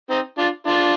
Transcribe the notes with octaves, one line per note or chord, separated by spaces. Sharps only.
C4 D#4
D4 F4
D4 F4